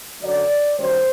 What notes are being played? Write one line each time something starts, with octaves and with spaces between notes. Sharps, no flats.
F#2 D3 F#3 D5
F#2 D#3 G3 C5